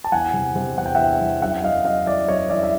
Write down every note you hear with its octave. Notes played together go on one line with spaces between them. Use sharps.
A5
E2 F#5 G#5
C3
C3
E2 F#5
G5
E2 E5 F#5
E2
F#2 E5 F#5
F#2 D#5 F5
F#2 D#5 F5
E3 D5 E5
F#2 C#5 D#5
E3 D5 E5
E5